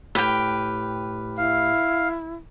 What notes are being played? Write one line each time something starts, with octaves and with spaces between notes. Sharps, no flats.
A2 G4 B4 G5 F6
E4 F5